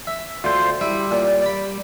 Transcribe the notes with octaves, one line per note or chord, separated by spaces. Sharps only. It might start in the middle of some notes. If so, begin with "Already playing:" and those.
E5
D2 F4 C5
G3 E4
A#2
D5 B5